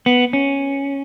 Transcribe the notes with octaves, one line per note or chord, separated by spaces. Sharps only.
B3
C#4